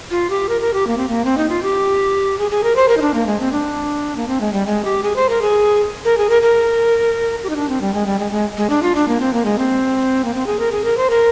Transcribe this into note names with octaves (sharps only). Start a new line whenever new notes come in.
F4
G4
A#4
A#4
G4
A#3
C4
A#3
C4
D#4
F4
G4
G#4
G#4
A#4
C5
A#4
D#4
D4
A#3
G#3
C4
D4
A#3
C4
G#3
G3
G#3
G4
G#4
C5
A#4
G#4
A#4
G#4
A#4
A#4
G4
D#4
D4
C4
G3
G#3
G3
G#3
G#3
G#3
D4
F4
D4
A#3
C4
A#3
G#3
C4
A#3
C4
G#4
A#4
G#4
A#4
C5
A#4